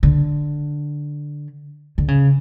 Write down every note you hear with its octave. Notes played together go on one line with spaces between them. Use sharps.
D3
D3
C#3